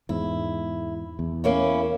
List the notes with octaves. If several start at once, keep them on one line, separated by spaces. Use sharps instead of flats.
E2 G#2 E4
E2
A#3 C#4 E4